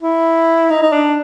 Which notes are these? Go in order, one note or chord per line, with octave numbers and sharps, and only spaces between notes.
E4
D#4
D#4
D4